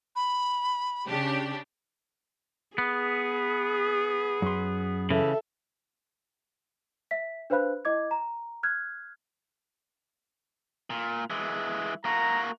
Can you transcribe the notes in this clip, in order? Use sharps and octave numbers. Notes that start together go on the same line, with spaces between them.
B5
C#3 D4 G4
B3 G#4
F#2 C6
C#3 E3 A4 E5
E5 B6
D4 B4 C5 F5 B5 F#6
E4 D#5 D6 G#6
A#5
F6 F#6 G#6
A#2
E3 G#3
A#3 F#4 A#5